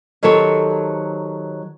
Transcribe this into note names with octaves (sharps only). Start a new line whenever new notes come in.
D#3 F#3 G4 A4 C5 C#5